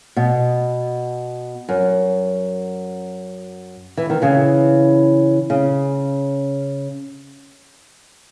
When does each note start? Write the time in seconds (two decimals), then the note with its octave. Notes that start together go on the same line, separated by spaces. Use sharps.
0.17 B2
1.69 F#2
3.97 E3
4.10 D#3
4.22 C#3 E3
5.50 C#3